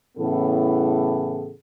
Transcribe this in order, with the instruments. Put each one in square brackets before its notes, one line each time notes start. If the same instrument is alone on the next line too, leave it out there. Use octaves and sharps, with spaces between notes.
[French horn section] A2 C#3 E3 B3 G#4 A4